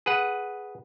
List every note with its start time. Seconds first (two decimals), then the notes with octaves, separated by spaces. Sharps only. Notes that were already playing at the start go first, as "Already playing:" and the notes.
0.06 G#4 B4 F#5